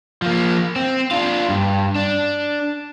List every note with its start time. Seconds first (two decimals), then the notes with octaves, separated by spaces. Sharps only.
0.22 F3 A#3
0.76 C4
1.11 D4 F4
1.49 G2
1.96 D4